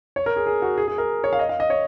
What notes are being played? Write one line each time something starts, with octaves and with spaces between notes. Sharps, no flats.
C#5
A#4
G#4
G#4
F#4
G#4
G#4
A#4
C#5
F5
D#5
F5
D#5
C#5